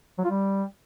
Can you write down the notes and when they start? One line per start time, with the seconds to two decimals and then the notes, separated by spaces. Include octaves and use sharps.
0.19 F#3
0.24 F4
0.30 G3